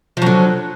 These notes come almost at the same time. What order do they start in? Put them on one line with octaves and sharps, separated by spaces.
F3 F#3 D3